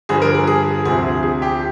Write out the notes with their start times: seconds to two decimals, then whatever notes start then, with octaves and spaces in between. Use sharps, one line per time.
0.09 G2 D3 F3 G#4
0.22 A#4
0.35 G#4
0.47 G#4
0.85 D2 C3 F3 G#4
1.23 G#4
1.42 G4